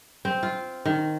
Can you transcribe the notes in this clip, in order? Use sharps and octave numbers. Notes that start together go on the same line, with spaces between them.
C4
F4
D#3